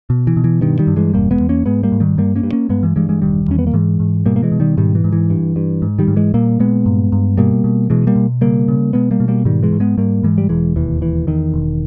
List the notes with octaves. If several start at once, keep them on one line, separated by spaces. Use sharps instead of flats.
B2
E3
B2
E3
G2 D#3
D#3 G3
G2
E3 G#3
E1 G3 A#3
G#3 B3
E2
A#3 C#4
G#2 G#3 B3
G3 A#3
G#2
D#3 G3
G2 G3 A#3
A#3 C#4
G2
A#3 C#4
G2 G#3 B3
E3 G#3
G2 E3 G#3
E3 G#3
E1 D#3 G3
E2 C#4
B3
A#3
G#2 E3 G#3
G#2
B2 G3 A#3
A#3
E3 G#3
B2
D#3 G3
G#2 D#3 G3
E3
G#2
E3
G2
G2
G#2
D#3 G3
G#2
E3 G#3
A#2 G3 A#3
A#2 G#3 B3
G2
G2
B2 G3 A#3
B2
B2 E3 G#3
G3 A#3
B2
C#3 G3 A#3
C#3
B2 G#3 B3
G3 A#3
B2
G3 A#3
G#2 D#3 G3
E3 G#3
G#2
G#3 B3
G#2 G3 A#3
G#2 E3 G#3
G3
E1 E3 G#3
D#2 E3
E1 E3
E2 D#3
E1